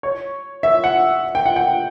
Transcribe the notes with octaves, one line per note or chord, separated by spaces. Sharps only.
C#5
E5
F#5
G5
F#5
G5